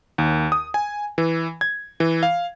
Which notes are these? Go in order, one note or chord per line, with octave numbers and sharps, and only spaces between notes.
D#2
D#6
G#5
E3
G#6
E3
F5